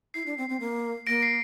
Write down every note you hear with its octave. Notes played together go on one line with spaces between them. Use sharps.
E4 C7
D4
C4
C4
A#3
A#3 A#6 D7
C7